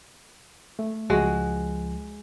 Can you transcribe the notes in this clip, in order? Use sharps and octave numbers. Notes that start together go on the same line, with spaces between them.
A3
C#2 F3 G#3 F#4